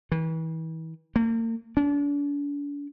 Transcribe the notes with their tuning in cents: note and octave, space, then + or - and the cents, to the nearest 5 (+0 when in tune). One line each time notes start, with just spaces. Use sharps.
E3 -35
A#3 -40
D4 -40